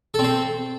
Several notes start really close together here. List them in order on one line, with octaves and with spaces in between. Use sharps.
A4 C4 C5